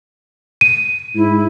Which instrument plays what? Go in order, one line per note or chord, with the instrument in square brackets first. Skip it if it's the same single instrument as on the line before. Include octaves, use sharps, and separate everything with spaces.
[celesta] D#7
[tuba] G#2 [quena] E4